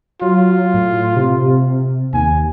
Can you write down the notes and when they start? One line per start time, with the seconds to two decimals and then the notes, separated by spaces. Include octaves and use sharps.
0.22 F#3 F4
0.74 A2
1.16 C3
2.14 D#2 G#5